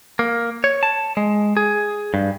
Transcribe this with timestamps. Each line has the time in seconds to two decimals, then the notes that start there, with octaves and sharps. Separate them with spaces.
0.19 A#3
0.64 C#5
0.83 A5
1.17 G#3
1.57 G#4
2.14 G2